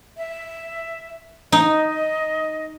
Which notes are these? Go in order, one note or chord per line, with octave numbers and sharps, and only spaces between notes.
E5
D#4 D#5